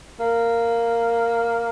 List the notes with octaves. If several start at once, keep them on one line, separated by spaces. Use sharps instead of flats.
A#3